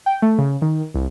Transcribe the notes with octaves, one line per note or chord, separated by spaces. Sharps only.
G5
A3
C#3
D#3
C2